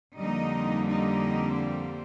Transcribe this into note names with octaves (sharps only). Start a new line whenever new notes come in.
F2 D3 G3 A#3 D#4 D#5
D#4 D#5
C4 C5